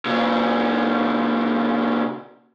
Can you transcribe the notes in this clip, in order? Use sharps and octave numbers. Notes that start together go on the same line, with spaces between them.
A#2 C#3